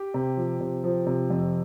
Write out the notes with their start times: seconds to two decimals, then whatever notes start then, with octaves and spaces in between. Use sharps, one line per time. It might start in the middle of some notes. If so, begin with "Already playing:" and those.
Already playing: G4 G5
0.14 C3
0.37 F3
0.61 C3
0.84 F3
1.07 C3
1.30 F2